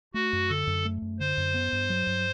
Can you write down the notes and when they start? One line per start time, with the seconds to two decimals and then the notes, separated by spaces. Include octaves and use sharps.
0.14 A3 F#4
0.33 F#2
0.50 D3 A4
0.67 F#2
0.85 A3
1.02 F#2
1.20 D3 C5
1.37 F#2
1.54 B3
1.72 G2
1.90 F#3
2.07 G2